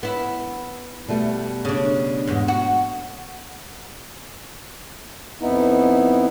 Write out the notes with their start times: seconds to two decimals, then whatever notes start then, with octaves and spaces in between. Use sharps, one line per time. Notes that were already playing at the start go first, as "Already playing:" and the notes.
0.03 B3 E4
1.08 B2 G3 A3
1.65 C#3 D4
2.27 E2 G#2
2.48 F#4
5.41 F2 B3 D#4 E4